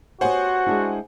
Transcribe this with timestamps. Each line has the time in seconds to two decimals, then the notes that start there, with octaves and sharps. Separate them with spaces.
0.21 B3 F#4 G4 C5 C#5 F#5 G#5
0.67 G#3 D4 E4